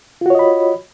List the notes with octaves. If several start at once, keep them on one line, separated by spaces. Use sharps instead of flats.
F4 F#4 C#5 D#5 B5